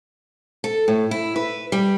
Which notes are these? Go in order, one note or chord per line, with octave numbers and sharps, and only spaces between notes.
A4
A2
E4
B4
G3